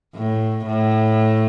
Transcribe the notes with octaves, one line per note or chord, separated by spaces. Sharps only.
A2
A2